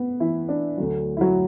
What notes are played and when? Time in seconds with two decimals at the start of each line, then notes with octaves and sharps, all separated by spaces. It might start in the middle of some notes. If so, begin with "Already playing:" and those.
Already playing: B3
0.20 E3 E4
0.49 D4
0.78 D2 D3 F#3
1.17 E4
1.21 F#3 F#4